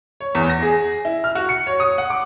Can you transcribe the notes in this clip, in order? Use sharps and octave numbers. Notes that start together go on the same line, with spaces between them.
C#5
E2
A#6
G#4
E4
F6
F#4
C#7
C#5
D#6
F#5
D6